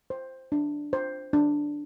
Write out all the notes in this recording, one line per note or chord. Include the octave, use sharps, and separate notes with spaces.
C5
D4
C5
D4